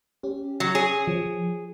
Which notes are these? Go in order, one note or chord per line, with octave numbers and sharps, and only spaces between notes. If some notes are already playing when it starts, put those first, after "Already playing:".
C#4 G4
F#3
G#4 C#5
F3